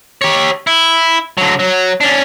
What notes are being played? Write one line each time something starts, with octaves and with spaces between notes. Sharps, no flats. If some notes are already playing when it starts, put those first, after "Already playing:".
G4 C#5
E4
D3 F#3
F#3
C#4 D4